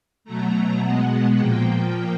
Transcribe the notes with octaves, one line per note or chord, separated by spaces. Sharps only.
B2 F#3 A3 A#5
A#5
B2 G#3 B3 F#5
A#2 F3 A#3 G5